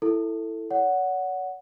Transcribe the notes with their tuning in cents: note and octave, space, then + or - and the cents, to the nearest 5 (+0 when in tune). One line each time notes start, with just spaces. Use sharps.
E4 +0 A4 +10
C#5 +40 F#5 +0